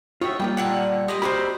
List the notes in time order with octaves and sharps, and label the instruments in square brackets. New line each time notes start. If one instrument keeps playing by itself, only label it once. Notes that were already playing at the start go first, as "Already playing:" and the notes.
[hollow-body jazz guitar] F4 F#4 E5 [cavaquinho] C#5 D#5 G5
[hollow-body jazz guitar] G3 A#3 F4 [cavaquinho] G5
[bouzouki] A#2 D3 F#5
[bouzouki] G3 G#3 B4 [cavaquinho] D#5
[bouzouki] A#3 C4 C5 [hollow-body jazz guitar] F#4 G4 B5